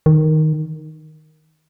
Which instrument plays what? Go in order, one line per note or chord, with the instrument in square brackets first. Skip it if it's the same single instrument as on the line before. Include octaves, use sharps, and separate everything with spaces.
[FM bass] D#3